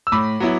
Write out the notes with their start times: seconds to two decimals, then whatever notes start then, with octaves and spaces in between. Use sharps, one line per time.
0.07 E6
0.12 A2 B5 D6
0.40 F#3 B3 E4